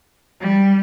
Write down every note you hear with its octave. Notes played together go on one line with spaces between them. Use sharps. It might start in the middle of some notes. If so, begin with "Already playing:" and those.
G3